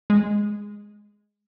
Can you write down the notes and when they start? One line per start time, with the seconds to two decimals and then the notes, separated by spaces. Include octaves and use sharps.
0.10 G#3